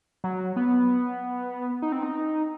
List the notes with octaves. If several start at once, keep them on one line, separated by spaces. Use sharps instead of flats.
F#3
B3
D#4
C4
D#4